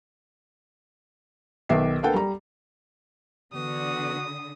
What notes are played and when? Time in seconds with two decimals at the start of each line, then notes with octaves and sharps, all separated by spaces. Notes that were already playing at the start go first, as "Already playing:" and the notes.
1.69 B1 D#3 B4 E5 D6 C7
2.03 A#3 B3 D4 A4 F#5 G5
2.14 G3 A#5
3.53 D3 E3 B3 F#4 B4 D#6